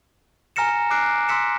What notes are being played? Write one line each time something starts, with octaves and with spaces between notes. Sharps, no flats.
G#5 A#5 F6 A#6 C#7 E7
D6 F6 F#6 C7 D7
C6 E6 B6 C#7 E7